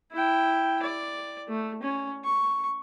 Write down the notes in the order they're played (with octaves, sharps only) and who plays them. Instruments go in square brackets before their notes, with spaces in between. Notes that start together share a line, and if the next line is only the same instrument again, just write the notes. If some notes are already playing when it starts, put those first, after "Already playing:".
[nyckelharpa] E4 G5
D5
A3
C#4
C#6